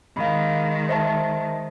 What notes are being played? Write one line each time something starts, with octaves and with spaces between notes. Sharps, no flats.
D#3 G#3 F5 B5
C5 E5 A5